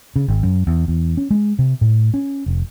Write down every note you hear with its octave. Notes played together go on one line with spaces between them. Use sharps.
C#3
G#1
F#2
E2
E2
C#4
G#3
C3
A2
C#4
F1